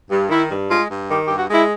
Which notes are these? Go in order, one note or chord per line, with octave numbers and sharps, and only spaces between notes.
G2
D#3 E4
G2
G#3 F4
G2
D#3 G4
G2 G4
F#4
G#3 E4